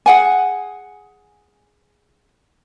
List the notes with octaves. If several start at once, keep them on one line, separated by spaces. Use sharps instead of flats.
G#4 F#5 G#5